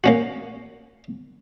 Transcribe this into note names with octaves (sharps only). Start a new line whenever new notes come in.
A#3 C#4 F#4